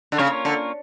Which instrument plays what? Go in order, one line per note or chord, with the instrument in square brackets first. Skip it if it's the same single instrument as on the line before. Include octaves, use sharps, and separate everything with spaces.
[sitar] D3
[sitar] C#3 [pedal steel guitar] A#3 C#4 F4 A#4 C#5
[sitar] D3